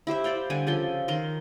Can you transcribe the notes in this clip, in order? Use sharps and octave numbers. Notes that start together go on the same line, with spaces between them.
E4 G4 C5 E5
C5 D5 F5 G5
D3 G3 G4 G#5
C#3 F3 A4 C6
D#3 A#4 C6